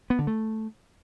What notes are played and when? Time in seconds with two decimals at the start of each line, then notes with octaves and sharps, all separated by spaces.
0.10 B3
0.19 D3
0.27 A3